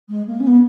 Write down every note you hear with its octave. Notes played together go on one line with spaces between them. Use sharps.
G#3
A#3
C#4
B3